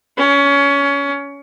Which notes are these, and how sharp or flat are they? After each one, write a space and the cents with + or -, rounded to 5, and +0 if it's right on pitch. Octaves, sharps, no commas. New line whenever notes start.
C#4 +25